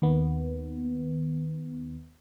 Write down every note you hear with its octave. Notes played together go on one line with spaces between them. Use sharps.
D#2 D#3 B3